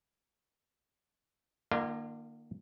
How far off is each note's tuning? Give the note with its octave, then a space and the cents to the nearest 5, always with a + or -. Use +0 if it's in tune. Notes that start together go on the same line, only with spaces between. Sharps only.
D3 +45 A#3 +0 F4 -35